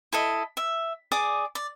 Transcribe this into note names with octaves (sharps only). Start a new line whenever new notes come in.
E4 A4 D#5
E5
G#4 D5 D6 D#6
D5